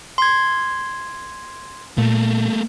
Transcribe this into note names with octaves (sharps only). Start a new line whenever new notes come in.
C6 G#6
A#2 A3 A#3